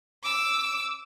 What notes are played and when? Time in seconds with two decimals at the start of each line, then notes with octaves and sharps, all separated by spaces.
0.23 D6 E6